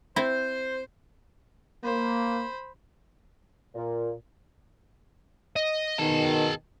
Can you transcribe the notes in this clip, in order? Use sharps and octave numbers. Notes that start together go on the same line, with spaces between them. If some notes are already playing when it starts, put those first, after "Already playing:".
C4 E4 C5
A#3 C5 B5
A#2
D#5
B2 D#3 G#4 A5